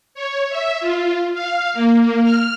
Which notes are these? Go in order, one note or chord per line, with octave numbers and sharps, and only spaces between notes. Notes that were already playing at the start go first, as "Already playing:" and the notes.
C#5
E5
F4
F5
A#3
F6